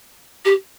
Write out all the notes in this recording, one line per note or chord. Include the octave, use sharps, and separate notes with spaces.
G4